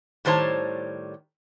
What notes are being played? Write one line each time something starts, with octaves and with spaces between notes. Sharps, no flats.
A2 D#3 G3 C5 C#5 A5